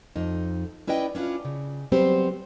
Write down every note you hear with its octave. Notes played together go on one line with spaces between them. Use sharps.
F2 D#4
C#4 E4 B4 D5 D#5 G5
C#4 D4 E4 F4
C#3
F#3 G3 B3 C4 G4 C5